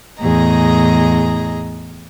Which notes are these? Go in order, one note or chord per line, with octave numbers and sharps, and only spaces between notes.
E2 A2 G#4 D#5 A#5